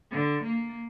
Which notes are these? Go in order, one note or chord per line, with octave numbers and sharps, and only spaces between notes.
D3
A#3